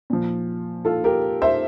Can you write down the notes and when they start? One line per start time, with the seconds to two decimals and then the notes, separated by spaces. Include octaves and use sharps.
0.10 A#2 F3
0.85 F4 A4
1.04 G4 A#4
1.42 C5 E5